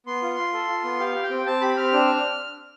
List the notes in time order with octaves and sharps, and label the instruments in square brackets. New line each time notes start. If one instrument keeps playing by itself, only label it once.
[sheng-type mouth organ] B3 C6
F4
F4
A4
F4
B3
G4 F5
G4
G5
C4
C4 A5
G4 B5
C4 F6
D4